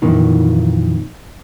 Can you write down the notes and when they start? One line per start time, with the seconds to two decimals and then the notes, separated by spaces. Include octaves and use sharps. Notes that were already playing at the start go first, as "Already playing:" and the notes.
0.02 F2 A#2 D#3 E3